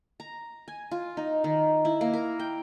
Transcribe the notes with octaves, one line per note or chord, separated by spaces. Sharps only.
A#5
G#5
F4
D#4
D#3
E4
A#3
A#4
G5